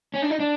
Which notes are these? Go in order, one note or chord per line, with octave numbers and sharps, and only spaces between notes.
C#4
D4
D#4
D4